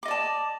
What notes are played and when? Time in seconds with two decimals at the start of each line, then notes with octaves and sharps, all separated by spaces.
0.03 D6
0.05 D#5
0.08 D5
0.11 A5